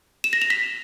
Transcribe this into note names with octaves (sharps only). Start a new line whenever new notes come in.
E7
A#6
F7
B6